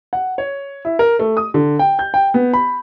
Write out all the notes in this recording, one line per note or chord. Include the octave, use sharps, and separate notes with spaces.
F#5
C#5
E4
A#4
A3
D#6
D3
G5
G6
G5
B3
B5